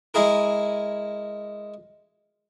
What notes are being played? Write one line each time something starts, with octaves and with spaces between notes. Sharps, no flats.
G#3 E4 G#4 A#4